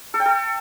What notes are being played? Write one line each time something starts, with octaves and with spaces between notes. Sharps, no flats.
A4
G5
A4